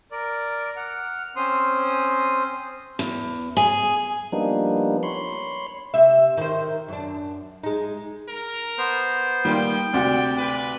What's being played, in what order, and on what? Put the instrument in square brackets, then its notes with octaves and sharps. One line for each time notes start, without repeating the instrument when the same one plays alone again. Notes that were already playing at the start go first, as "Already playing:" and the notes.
[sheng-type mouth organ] A#4 D5
F#5 F6
C4 C#4 C5 C6 D#6
[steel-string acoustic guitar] E2
G#4
[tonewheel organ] F3 G3 A#3 B3 D4 D#4
C#5 B5 C6
[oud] C3 E5
D#3 C5
F#2 D4
G#3 D#4
[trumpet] A#4
[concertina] B3 C5
[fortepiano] D#3 G3 A#3 [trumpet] G5
[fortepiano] D2 C3 F#4 [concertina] D5
[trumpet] B4